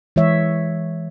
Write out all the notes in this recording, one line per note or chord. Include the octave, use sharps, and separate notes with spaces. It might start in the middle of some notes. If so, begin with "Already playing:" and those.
E3 G#3 C#5 E5